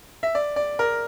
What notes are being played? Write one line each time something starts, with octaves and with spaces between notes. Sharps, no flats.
E5
D5
D5
A#4